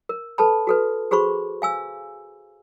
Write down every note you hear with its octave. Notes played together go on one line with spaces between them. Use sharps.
A#4
A4 B4 A5 B5
F#4 A4 B4
F#4 G#4 C5 B5 C#6
F5 G#5 E6